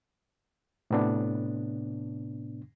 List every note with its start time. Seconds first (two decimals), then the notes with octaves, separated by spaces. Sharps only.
0.91 A2 C3 B3 D4